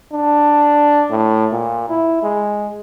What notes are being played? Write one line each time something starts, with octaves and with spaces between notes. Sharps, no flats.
D4
A2
A#2
E4
G#3